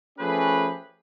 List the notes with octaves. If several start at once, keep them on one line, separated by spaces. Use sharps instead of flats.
F3 A3 C#4 G4 G#4 B4